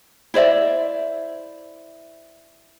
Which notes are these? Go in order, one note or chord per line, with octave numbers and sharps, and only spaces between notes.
E4 C5 D5 E5